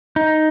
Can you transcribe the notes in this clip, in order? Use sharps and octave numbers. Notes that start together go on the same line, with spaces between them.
D#4